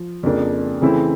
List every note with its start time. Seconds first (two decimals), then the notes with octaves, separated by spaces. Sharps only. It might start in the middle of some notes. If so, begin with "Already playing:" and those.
Already playing: F3
0.23 F2 C#3 F3 A#3 D4
0.81 C#3 E3 A3 C4 E4